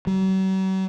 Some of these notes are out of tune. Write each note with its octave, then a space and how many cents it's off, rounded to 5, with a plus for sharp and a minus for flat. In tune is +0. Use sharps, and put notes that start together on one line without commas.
F#3 +45